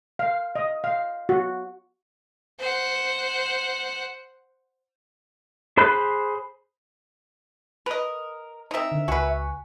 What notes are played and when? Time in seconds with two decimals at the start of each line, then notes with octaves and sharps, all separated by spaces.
0.19 F5
0.55 D#5
0.84 F5
1.29 F#4
2.59 C5 F#5
5.77 G#4 C5 B5 F#6 G6
7.86 A#4 B4 D#5
8.71 C4 D#4 A#4 E5
8.92 D3
9.08 C#2 F#4 B4 G#5 C#6